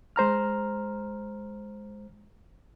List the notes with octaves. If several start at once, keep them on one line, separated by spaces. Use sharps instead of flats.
G#3 C5 A#5 F6